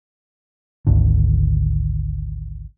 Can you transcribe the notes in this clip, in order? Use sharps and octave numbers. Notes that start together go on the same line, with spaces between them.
G#1 D2 D3